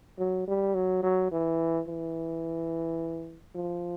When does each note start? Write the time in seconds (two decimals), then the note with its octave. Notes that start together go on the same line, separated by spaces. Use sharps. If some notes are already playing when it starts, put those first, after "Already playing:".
0.19 F#3
0.47 G3
0.75 F#3
1.03 F#3
1.31 E3
1.88 E3
3.55 F3